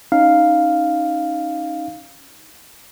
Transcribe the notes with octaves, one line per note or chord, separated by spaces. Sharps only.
C#4 D#4 F5